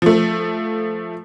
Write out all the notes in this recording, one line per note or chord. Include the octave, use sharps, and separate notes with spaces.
F3 A3